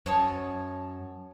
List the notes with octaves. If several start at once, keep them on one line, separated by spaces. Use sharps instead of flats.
F#2 C#5 A5 D#6